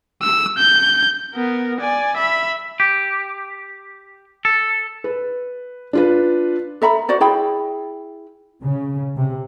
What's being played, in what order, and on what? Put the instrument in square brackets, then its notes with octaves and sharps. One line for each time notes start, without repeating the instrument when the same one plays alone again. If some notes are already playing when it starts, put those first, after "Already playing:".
[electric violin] E6
G6
B3 A#4
D5 G#5
E5 B5
[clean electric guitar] G4
A4
[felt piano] B4
D4 F4 B4
[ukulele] A4 E5 A#5 B5
F#4 C5 D5 F#5
E4 G#4 G5 B5
[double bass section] C#3
C3